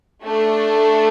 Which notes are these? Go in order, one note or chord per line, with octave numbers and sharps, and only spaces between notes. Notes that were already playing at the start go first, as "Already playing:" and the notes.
A3 D4 A4